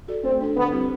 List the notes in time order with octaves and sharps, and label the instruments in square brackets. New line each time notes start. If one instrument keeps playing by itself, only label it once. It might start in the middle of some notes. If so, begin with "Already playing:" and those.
[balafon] F#4 A4 D5
[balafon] A3 [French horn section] C4
[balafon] D4 A4
[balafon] D3 [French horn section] B3
[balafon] G3 C4 E4 G4